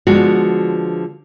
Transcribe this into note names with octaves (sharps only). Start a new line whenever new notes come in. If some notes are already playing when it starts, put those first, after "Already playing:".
D3 F3 G#3 B3 F#4